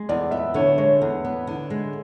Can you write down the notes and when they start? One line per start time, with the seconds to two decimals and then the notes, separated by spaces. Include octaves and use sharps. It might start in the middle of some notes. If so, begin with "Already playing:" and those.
Already playing: G#3
0.09 E2 D5
0.31 B3 E5
0.54 D3 C#5
0.78 G#3 C#5
1.02 E2
1.25 B3
1.47 D3
1.70 G#3